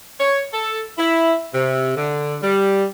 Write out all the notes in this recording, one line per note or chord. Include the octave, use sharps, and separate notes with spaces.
C#5
A4
E4
C3
D3
G3